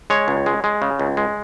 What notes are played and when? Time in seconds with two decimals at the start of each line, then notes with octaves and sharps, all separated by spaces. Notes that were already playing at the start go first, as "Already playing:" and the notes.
0.10 G#3 C#5
0.28 C#2
0.46 G#3
0.64 G#3
0.82 C#3
0.99 C#2
1.17 G#3